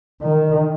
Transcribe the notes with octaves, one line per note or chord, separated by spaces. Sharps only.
D#3